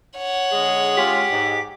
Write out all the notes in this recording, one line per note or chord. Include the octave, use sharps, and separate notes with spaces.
C#5 F#5
D3 G#3 G#4
G#3 C#4 F4 G4
G#2